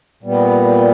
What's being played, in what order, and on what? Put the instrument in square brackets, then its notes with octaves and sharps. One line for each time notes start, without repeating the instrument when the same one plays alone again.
[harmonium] A#2 G3 B3